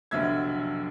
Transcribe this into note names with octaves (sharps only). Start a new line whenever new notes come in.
F1 B1 D3 F#3 E5 G#6